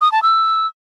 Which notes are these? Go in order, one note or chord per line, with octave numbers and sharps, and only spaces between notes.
D#6
A5
E6